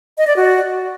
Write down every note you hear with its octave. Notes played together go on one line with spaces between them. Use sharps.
D#5
D5
F#4